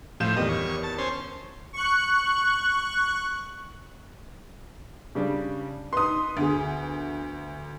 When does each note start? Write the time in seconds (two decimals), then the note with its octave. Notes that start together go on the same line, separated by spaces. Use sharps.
0.20 A2 F3 F4 G6 E7
0.36 E2 D#3 G3 D#5
0.49 C#5
0.83 A5
0.98 C#4 C5
1.73 C#6 F#6
5.15 C#3 G3 D4
5.93 D#4 B4 C6 D#6
6.37 D2 B3 G#4